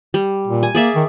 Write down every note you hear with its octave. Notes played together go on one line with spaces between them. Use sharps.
G3
A#2
G#5
A#3 G#4 D5 E5
D#3